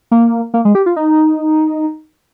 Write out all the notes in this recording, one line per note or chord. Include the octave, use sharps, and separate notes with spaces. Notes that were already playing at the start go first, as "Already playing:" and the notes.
A#3
A#3
G#3
G4
F4
D#4